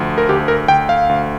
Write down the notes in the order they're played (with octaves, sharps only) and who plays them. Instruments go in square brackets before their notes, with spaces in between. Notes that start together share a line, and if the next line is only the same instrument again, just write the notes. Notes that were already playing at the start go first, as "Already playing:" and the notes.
Already playing: [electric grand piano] D2 F3
A#4
D2 G4
A#4
D2 G5
F5
D2